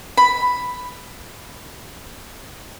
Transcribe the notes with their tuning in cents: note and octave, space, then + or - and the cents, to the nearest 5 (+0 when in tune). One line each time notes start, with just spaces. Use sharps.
B5 +5